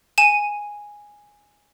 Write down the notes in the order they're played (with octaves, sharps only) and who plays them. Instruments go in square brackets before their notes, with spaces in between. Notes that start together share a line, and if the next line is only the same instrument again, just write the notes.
[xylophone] G#5 D#7 E7